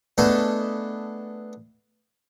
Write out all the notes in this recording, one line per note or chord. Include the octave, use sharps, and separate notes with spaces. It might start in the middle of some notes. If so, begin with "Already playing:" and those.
A3 B3 D4 G#4 A4 D#5